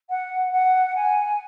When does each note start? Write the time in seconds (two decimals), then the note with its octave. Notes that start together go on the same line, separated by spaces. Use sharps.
0.10 F#5
0.53 F#5
0.95 G#5